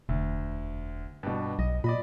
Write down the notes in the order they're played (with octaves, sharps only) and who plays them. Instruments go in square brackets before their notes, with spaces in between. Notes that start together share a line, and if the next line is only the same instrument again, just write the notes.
[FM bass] E1 [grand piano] D2
[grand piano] G2 B2
[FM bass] B1 [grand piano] D#5
[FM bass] A#2 [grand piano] D5 D#5 B5